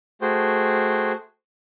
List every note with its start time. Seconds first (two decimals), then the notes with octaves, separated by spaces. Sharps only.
0.22 A3 F#4 G#4 C5 G5